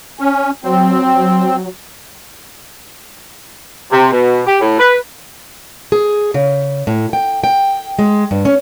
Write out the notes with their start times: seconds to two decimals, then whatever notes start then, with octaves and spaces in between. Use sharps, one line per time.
0.19 C#4
0.64 F#3 C4
3.90 C3
4.11 B2
4.46 G4
4.60 A2
4.79 B4
5.92 G#4
6.34 C#3
6.87 A2
7.13 G5
7.44 G5
7.99 G#3
8.31 G2
8.45 C#4